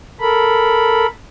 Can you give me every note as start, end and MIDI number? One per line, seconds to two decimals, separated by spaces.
0.20 1.06 69
0.20 1.06 70
0.20 1.06 83